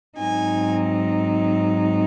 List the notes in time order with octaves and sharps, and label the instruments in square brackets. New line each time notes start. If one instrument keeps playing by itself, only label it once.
[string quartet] G#2 F#3 C4 D#4 G#5